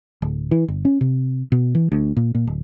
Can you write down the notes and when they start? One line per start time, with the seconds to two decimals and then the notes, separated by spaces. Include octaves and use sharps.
0.22 D1
0.51 E3
0.68 G1
0.85 C#4
1.01 C3
1.52 B2
1.75 E3
1.92 D2
2.17 A#2
2.35 A#2
2.47 D1